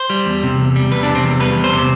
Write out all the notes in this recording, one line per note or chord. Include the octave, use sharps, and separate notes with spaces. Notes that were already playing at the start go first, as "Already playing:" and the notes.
Already playing: C5
G3
E2
C3
E2
G3
E2 B4
D4
C3
C4
E2
G3 B4
E2
C5
C3